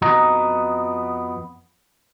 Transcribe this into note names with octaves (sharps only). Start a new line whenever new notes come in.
F2 B3 F#4 D#5 A#5